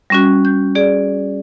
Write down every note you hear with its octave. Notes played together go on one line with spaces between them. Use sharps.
G3 C#4 F#4
G6
G#4 D5